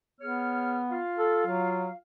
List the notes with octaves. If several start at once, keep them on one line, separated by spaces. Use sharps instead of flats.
B3 G#4 C#5 F6
F4 F5
A4
F#3